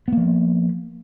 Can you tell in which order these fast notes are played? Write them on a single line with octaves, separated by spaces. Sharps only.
B3 A#3 F3